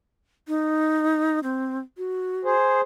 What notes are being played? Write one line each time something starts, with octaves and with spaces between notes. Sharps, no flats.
D#4
C4
F#4
G#4 C5